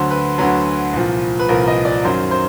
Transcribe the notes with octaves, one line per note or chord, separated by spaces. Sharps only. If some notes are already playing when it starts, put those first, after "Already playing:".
Already playing: D2 D3 F#3 C5
B4
D2 D3 F#3 B4
C2 A#2 F3
B4
C2 A#2 F3 A#4
D#5
D5
F#2 D#3 F#3 C5
C5